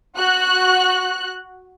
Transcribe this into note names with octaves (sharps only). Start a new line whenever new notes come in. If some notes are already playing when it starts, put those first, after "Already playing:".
F#4 F#6